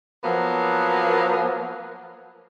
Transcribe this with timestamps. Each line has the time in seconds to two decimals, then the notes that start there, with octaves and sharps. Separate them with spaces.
0.24 F3 F#3 A#3 B3